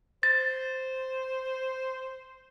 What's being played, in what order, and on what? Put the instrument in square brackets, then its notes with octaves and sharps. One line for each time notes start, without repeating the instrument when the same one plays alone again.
[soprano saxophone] C5 [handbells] A6